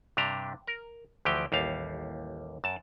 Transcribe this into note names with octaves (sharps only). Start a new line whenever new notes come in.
G2 C3 D4 G4 A#5
A#4
D2 E3 F3 G4 G5
A1 D#2 G3 F5
F#2 A5